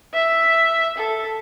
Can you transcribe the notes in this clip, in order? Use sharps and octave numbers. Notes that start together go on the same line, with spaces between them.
E5
A4